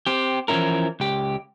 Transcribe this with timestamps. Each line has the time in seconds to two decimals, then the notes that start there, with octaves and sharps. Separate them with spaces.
0.07 C4 G4
0.48 E3 F3 G3 C#4 E4 A#4
1.00 C#2 G4